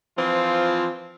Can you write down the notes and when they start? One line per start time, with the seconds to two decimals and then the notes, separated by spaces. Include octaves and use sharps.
0.18 E3 F3 C4 F4